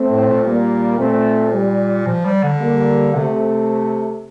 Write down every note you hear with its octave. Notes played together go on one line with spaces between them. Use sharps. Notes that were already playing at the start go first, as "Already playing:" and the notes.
Already playing: A3 C4
A2
A#2
G3 A#3
A#2 A3 C4
G3
F3
G3
D3
G3 A#3
C3 A3 C4